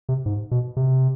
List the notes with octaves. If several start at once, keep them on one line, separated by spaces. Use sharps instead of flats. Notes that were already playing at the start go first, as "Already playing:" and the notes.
C3
G#2
B2
C3